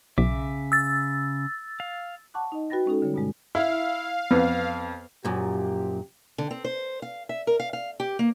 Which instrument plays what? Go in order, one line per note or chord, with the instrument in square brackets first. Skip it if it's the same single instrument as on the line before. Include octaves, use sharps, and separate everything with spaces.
[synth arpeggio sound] B1 [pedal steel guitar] C#3 E5 D6
[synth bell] E6 A6
[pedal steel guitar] F5
[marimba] F#5 A5 C#6 D6 F#6
D#4 D#5
F#4 B4 G5 B5 A6 A#6
G#3 C#4 D#4 A4
D3 G3 C#5
G2 B2 G#3
[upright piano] E4 [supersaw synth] F5
[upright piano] F2 [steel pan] B3
[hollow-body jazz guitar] F#2 A#2 [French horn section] F3 G4
[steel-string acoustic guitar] D3
C4
C5
F5
E5
A#4
F5
F5
G4
A#3